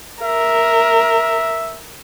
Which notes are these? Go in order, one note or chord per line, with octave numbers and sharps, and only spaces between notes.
A#4 E5